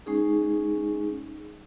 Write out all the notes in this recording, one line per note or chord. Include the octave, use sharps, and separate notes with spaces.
G#3 C#4 D#4 G#4